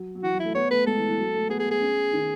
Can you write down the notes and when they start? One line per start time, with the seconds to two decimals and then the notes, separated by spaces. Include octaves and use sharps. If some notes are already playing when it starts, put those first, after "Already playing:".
Already playing: F#3
0.15 F#3
0.23 E3 F#4
0.34 F#3
0.40 A3 E4
0.55 B3 C#5
0.71 A3 B4
0.86 G#3 A4
0.97 E3
1.08 E3
1.18 F#3
1.34 A3
1.49 B3 G#4
1.60 G#4
1.71 G#4
1.81 C#4
2.13 D#3